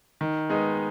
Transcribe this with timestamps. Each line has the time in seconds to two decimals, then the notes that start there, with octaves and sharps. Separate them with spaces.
0.21 D#3
0.49 G#3 B3 D#4